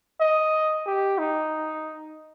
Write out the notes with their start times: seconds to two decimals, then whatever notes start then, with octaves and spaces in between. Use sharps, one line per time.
0.20 D#5
0.86 G4
1.18 D#4